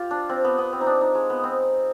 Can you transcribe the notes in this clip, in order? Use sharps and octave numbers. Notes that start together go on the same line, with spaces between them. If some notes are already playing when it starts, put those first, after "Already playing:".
Already playing: F4 G4
D4
C4
B3
B3
C4
D#4
D4
D#4
G#3
B3
C4